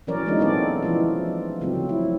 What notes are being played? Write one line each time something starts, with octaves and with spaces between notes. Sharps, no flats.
E3 F#3 C#4 A#4 C#5 D5
E3 G#3 A3 D4 D#4 F4
B3 C4 A4 D5
E3 F3 E4 F4
C#3 F3 F#3 A3 C4
E4